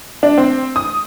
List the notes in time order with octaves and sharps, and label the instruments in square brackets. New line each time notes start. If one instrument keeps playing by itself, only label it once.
[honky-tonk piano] D4
C4
D#6